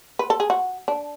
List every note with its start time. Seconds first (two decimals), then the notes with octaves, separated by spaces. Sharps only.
0.19 B4
0.30 A4
0.40 G#4
0.50 F#4
0.88 D4